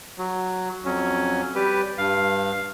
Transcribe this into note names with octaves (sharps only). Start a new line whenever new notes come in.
F#3
F2 F#3 C#4
G3 G4 B4
G2 F5